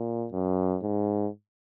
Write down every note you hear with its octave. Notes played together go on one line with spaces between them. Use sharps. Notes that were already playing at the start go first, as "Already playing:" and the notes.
Already playing: A#2
F#2
G#2